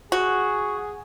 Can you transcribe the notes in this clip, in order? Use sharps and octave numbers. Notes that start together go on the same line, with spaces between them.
F#4 G#4